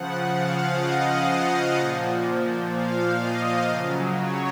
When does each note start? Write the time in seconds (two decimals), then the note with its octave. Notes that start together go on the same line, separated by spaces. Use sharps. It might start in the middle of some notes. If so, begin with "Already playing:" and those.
Already playing: C#3 F3 F#5
0.33 F5
0.81 D#5
1.29 F5
1.77 A#2 F3
2.73 F5
3.21 D#5
3.69 C#3 F#3
4.17 C#5